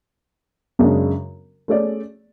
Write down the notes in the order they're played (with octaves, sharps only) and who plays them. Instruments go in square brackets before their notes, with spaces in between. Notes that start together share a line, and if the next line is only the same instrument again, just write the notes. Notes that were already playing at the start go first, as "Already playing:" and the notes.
[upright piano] F#2 C#3 G#3 D4
A3 C#4 G#4 D5